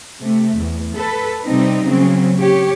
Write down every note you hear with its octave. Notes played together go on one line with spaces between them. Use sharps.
C3 A3
E2
A4 B4
C3 G3 C4 D#4
C#3 F#3 A#3 C4 C#4
G4 C#5